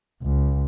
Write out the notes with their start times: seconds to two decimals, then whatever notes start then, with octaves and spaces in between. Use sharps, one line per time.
0.22 C#2